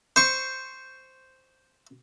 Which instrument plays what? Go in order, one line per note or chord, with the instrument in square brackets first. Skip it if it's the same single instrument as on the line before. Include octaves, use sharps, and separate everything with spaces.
[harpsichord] C5 C#6